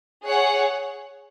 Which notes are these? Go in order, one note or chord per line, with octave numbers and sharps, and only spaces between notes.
G#4 C#5 F#5